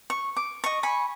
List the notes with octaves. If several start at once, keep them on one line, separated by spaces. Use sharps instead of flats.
C#6
D6
D#5 C#6
G#5 B5 C#6